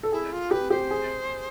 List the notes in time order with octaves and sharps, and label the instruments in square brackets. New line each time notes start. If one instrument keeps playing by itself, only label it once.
[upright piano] A4
[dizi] E4 [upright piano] G#4
[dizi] F4
[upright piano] G4 [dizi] B4
[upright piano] G4 [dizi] C5
[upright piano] G#4